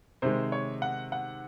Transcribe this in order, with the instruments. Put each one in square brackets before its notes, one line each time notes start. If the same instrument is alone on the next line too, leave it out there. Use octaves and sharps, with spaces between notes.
[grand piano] C3 D#3 G#3 C5
C#5
F#5
F#5